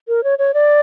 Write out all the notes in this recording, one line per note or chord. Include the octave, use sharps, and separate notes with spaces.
A#4
C#5
C#5
D5